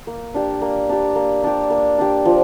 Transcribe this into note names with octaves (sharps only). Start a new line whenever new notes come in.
A#3
D4 G4
A#3
D4 G4
A#3
D4 G4
A#3
D4 G4
F3